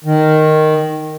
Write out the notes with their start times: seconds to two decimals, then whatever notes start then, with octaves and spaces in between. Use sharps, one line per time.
0.04 D#3